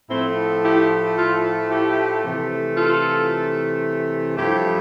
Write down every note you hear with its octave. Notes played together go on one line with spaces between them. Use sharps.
A2 F3 A3 C4 E4
E4 G4
F4 A4
E4 G4
C3 E3 A3
F4 A4
G2 F3 A3 E4 G4